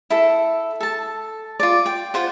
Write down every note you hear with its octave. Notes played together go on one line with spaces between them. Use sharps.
E4 A4
A4 A5
F4 D5
G5
F4 C5 F#5